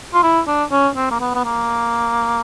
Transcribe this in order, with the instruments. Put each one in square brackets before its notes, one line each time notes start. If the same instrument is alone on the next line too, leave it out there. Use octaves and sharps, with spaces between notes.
[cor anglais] F4
E4
D4
C#4
C4
A#3
B3
B3
A#3